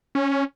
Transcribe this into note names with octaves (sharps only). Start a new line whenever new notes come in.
C#4